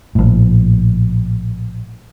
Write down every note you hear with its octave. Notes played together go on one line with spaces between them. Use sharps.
A#1 A2